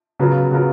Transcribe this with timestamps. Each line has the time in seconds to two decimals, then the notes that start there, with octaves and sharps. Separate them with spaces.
0.19 C#3 F#3 B3 F4 A#4
0.51 C#3 F#3 B3 F4 A#4